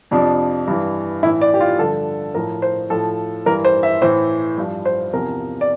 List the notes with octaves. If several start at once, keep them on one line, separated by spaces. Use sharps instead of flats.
F2 C3 F3 D4
G2 E3
A2 E3 E4
D5
G4
F4
G2 D3 F3 A4
A2 F3 A#4
C5
A2 F3 A4
G2 E3 A#4
C5
E5
A2 E3 C5
G2 F3
C5
E2 C3 F3 A#4
D5